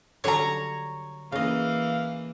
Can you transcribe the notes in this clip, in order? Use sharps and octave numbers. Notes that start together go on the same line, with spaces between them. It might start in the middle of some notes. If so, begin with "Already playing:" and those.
D3 F#3 G3 C#5 A#5
C#3 E3 A#3 D#5 F5